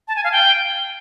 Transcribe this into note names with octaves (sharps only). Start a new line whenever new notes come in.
A5
G#5
F5
G5